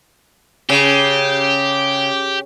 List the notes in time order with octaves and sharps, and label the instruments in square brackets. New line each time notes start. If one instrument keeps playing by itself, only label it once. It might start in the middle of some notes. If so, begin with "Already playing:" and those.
[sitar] C#3 [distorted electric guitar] G4